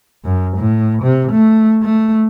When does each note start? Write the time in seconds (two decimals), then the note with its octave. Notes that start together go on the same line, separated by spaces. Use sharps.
0.25 F#2
0.57 A2
1.03 C3
1.31 A3
1.83 A3